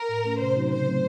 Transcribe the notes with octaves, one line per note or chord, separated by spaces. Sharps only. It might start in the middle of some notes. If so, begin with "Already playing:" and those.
Already playing: A#4
A2
A3 C#4
C3 C5
F#3 C4 D#4 F#4
C#3 C5
F#3 A3 C4